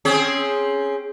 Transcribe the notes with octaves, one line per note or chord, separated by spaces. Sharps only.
C4 C#4 G#4